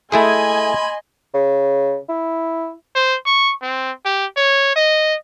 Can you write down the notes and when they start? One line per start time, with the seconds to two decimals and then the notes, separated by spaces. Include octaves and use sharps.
0.12 A3 E4 G#4 D#5 G#5 B5 C6
1.34 C#3
2.09 E4
2.96 C5
3.26 C#6
3.62 C4
4.06 G4
4.37 C#5
4.76 D#5